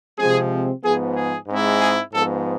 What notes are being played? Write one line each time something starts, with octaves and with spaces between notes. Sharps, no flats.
C3 F3 G#3 C4 G#4
G#2 F3 B3 G#4
G#4
G#2 G#3 C4 E4
G#4
G#2 F3 B3 A4